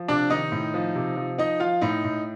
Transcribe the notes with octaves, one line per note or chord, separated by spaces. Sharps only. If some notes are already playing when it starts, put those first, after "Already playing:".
Already playing: F3
C3 D4 D5
D#3 D#4 D#5
A2
F3
C3
F3
F3 D#4 D#5
F3 F4 F5
A2 D#4 D#5
A2